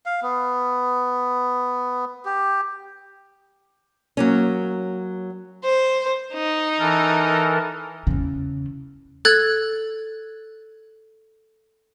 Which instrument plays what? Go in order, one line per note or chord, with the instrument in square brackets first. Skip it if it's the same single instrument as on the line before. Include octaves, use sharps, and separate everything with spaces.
[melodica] F5
B3
G4
[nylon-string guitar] F#3 A#3 C#4
[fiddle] C5
D#4
[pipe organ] E3 A4 A#4
[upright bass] E2 C#3
[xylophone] A4 E6 F#6 G#6 A6